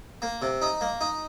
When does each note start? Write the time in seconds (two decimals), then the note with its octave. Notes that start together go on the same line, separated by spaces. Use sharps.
0.22 A#3
0.42 C3
0.62 D#4
0.81 A#3
1.01 D#4